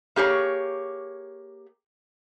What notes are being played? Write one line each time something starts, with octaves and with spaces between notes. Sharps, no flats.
A#3 G4 G#4 C#5